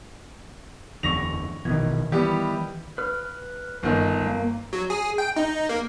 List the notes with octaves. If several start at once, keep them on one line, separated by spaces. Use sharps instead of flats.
F#1 E2 D3 C#6 A#6 F7
A#1 B2 D#3 E3 G#6
E3 G3 B3 G4
B4 F6
G1 D#3
A#3
F#3
G#4
G5
D#4
A#3